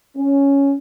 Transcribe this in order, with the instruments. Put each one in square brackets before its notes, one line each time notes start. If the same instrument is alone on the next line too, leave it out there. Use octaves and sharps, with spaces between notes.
[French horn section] C#4